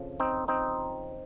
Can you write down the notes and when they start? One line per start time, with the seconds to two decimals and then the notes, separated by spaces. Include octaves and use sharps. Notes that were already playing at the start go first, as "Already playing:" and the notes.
Already playing: F2 C#3 F3
0.20 C4 D#4
0.48 C4 D#4